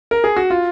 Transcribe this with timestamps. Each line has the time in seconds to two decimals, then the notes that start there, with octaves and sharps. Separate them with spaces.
0.11 A#4
0.24 G#4
0.37 F#4
0.50 F4